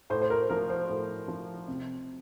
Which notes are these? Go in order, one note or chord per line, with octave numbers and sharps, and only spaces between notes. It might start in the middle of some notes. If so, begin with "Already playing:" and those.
A2 C5
C5
A#4
F3 A#4
C5
A2
F3
C3